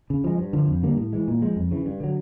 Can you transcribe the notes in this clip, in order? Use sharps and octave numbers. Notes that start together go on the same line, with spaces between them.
C#3
F3 G#3
G2
D3 F3
F2
D3 G3 A#3
A2
E3 G#3
A#2
F3 G#3
F2
C#3 E3
G2
D3 F#3